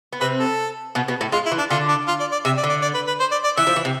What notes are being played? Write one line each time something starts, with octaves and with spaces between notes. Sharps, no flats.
B3
C3 C4 B4
A4
B2 B3
B2 B3
A2 A3
G#3 F4
E4
E3
D4
D3 F4
D4
F4
D5
D5
C3 E5
D5
D3
D5
D5
B4
B4
C5
D5
D5
E3 E5
F3
E3
C3